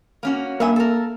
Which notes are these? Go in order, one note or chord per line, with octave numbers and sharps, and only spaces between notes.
A#3 C#4 F#4
G2 A#3 E5 G#5
A4 A#4